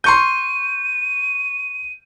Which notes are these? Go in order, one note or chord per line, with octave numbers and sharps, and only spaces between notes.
C6 C#6 G6 D#7